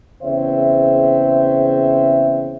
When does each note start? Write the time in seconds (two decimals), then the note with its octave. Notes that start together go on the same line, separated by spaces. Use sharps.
0.22 E2 C#3 C4 C5 C#5 E5